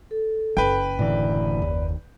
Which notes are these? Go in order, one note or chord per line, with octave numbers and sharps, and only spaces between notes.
A4
F#1 B4 G5
A2 D3 E3 D5
D#2